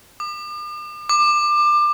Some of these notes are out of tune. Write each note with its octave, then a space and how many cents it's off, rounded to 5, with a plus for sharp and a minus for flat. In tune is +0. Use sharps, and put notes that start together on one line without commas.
D6 +45
D6 +25